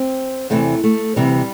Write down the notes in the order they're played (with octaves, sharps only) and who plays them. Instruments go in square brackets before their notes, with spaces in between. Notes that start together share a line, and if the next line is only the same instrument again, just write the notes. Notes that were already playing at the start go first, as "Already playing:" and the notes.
Already playing: [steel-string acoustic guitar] C4
E2 C3 E3 A3
A3
D2 C3 E3 G3